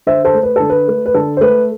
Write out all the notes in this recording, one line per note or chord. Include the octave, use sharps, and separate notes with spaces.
D3 C5 E5
A4 C5
A3
B4
D3 A4
B4
A3
B4
D3 A4
C5
A3 B4